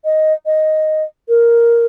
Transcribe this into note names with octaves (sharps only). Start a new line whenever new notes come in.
D#5
D#5
A#4